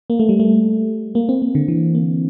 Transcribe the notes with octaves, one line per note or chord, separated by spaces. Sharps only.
A#3
A3
G3
A3
A#3
C4
A#3
D3
E3
A#3